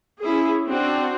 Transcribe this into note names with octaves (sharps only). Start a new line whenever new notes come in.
C#4 E4 G#4
C4 D4 F#4